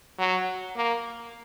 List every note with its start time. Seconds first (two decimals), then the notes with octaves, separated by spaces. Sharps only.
0.19 F#3
0.76 A#3